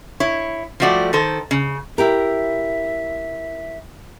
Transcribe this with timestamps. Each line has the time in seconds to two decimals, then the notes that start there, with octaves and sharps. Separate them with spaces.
0.20 E4 C#5
0.80 F3 G3 A3 F#4 D5
1.13 D#3 A4 C5
1.51 C#3
1.98 E4 G4 A#4 E5